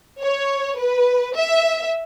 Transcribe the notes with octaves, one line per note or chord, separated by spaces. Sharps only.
C#5
B4
E5